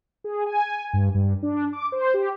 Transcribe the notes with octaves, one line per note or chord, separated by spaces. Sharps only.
G#4
G#5
G2
G2
D4
D6
C5
G4